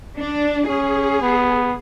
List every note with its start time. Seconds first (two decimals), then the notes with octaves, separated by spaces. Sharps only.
0.17 D4
0.69 C#4 G#4
1.22 B3